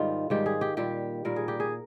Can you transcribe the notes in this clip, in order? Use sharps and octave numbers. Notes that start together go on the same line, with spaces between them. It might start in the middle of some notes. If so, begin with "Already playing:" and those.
Already playing: G#2 D#3 G3 F4
G#2 D#3 G3 G4
G#4
G4
A#2 G3 G4
A#2 G3 A#4
G#4
G4
G#4